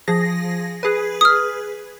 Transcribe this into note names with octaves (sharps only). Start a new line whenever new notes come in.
F3 G#4 A#6
G#4 B4
D#6 F6